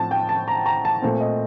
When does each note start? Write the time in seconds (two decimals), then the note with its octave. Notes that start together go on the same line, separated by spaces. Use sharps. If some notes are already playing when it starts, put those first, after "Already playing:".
Already playing: A2 F3 C4 A5
0.11 G5
0.29 A5
0.48 A#5
0.66 A#5
0.85 A5
1.02 A#2 A3 C4
1.21 D#5